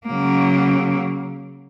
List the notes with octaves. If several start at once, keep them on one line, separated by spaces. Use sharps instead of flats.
C#3 F#3 A#3